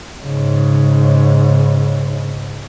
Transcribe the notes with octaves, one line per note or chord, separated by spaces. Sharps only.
G#2 C#3